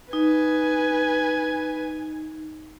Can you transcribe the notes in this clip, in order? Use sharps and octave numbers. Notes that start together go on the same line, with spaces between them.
D#4 B4 G#5